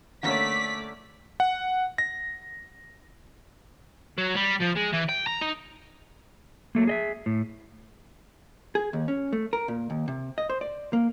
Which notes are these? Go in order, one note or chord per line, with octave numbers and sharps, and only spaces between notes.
D3 A3 A#3 C#4 D5 B6
F#5
A#6
F#3
G3
F3
G#3
E3
G5
A#5
D#4
F#3 A3 A#3
G#4 D#5 E5
A2
G#4
D#2
C#4
A3
A#4
A#2
D#2
C3
D#5
C5
D5
A#3